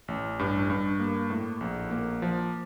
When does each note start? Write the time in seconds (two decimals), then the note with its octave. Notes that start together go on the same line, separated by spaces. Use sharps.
0.08 A1
0.39 G2
0.70 G2
1.00 A#3
1.30 A2
1.61 A#1
1.91 A#3
2.22 F3